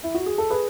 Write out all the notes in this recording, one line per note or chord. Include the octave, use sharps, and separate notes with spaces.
E4
F#4
G#4
A4
G#4 B4